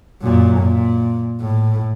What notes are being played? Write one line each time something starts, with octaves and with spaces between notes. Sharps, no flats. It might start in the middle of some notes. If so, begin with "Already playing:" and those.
F#2 A#2
A#2
A2